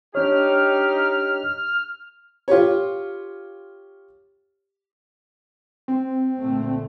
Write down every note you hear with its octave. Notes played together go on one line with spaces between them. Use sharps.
D4 D#4 G4 C#5 F6
F4 G4 C#5
C4
A#2 D3 A3